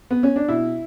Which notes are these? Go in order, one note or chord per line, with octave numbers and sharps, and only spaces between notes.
B3
C#4
D4
B2 E4